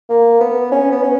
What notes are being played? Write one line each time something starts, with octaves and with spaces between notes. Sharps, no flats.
A#3
B3
C#4
B3
C#4